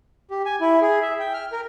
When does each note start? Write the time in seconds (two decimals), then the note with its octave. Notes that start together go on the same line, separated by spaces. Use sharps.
0.31 G4
0.46 G#5
0.61 E4
0.81 G#4
1.02 E5
1.19 G5
1.34 F6
1.52 A#4